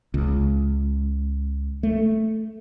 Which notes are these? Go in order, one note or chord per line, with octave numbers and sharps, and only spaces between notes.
C#2
A3